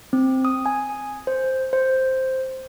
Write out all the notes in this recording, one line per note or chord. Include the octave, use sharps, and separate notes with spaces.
C4
D#6
G#5
C5
C5